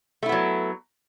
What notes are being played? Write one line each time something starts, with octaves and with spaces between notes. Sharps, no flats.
F#3 A3 B3 E4